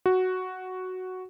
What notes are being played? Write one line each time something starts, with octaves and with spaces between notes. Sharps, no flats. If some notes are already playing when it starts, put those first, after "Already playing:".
F#4